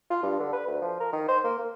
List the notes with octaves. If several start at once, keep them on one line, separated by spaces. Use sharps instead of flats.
F4
G2
D3
B4
D2
F3
A#4
D#3
C5
A#3
A#3